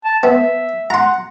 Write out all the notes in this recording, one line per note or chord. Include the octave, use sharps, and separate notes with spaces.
A5
B3 E5
F#5 A#5 C6